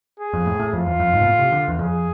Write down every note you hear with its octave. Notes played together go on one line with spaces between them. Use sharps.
G#4
F2
A2
A2
F2 F4
E2
F2
G#2
B2
A2
C3
D3
E2
F2 G#4